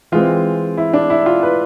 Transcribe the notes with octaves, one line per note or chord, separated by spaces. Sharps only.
E3 G#3 C4 F4
E4
D4
E4
F4
B4